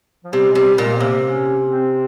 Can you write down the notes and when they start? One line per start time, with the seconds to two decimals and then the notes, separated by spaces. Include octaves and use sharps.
0.24 F3
0.33 C3 G3
0.50 G#3
0.55 C3 G3
0.78 A#2 G#3
0.95 C4
1.01 C3 A#3
1.23 C#4
1.68 C4